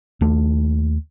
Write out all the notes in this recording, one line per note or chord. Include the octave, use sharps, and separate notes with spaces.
D#2 A3